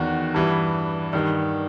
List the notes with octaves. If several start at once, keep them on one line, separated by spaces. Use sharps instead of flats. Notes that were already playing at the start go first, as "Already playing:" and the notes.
Already playing: E2 D#3 F#4
G2 E3
G2 D#3